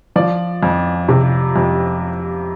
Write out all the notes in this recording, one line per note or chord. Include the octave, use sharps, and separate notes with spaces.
F3 D5
F2
C3
F2